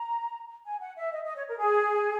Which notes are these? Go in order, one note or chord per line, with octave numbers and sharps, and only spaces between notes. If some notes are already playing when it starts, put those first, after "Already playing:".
Already playing: A#5
G#5
F#5
E5
D#5
D#5
C#5
A#4
G#4